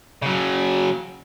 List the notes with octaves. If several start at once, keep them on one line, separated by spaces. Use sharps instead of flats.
C#3 F#3